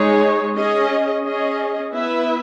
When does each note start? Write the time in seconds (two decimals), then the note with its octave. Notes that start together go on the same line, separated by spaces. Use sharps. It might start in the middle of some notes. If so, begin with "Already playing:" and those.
Already playing: G#3 D#4 G#4 C#5
0.56 C#4 G#4 D#5
1.24 C#4 G#4 D#5
1.92 B3 E4 B4 E5